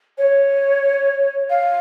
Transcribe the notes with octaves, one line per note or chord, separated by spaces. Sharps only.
C#5
F5